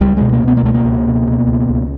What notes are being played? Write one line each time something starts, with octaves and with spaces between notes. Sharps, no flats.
C#2 G3
B2 G#3
A#3
B2 B3
A#3
C#2 A3
A#3
C#2
B2
B2
C#2
C#2